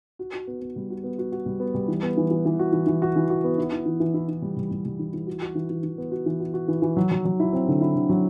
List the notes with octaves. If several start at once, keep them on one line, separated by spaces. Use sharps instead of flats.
F#4
F#4
B3
B3
G3
F#4
B3
F#4
F#4
G3
B3
G3
E3
B3
E3
E3
E3
F#4
E3
E3
F#4
E3
F#4
B3
E4
E4
E3
E3
E4
E4
G3
G3
G3
G3
E3
E3
F#4
F#4
E3
E3
E3
B3
F#4
E3
F#4
F#4
E3
E3
F#3
F#3
F#3
E4
C4
D3
E4
D3
F#3